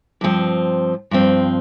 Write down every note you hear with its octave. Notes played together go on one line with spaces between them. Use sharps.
G2 F3 C4
G2 F3 C4